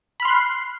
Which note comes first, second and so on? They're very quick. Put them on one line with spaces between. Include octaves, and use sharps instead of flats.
B5 F6 C6 F#6 C7